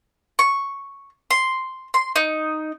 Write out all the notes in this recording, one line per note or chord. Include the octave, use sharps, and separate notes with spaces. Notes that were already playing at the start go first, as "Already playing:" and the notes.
C#6
C6
C6
D#4